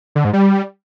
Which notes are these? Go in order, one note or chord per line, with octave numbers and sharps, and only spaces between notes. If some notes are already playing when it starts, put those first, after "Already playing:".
D3
G#2
G3